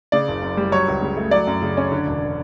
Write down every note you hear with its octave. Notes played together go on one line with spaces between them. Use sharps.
C#3 D5
F#1
F#2
G3
F#3 C#5
C#2
C#3
A3
F#3 D5
F#2
C#3
C#4
D3
E1